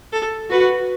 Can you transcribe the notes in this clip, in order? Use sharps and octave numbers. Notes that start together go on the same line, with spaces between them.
A4
F#4 B4